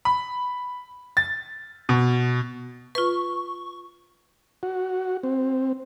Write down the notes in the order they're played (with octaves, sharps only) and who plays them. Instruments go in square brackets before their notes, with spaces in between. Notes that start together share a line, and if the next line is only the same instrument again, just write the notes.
[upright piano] B5
A6
B2
[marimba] F4 B4 [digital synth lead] C#6
[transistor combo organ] F#4
C4